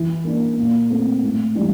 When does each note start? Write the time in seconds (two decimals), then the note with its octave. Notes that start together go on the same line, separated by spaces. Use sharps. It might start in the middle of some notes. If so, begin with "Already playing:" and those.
Already playing: E3
0.24 A#3 D4
0.57 A#2
0.90 A3 C4
1.23 A2
1.55 E3 G3 D4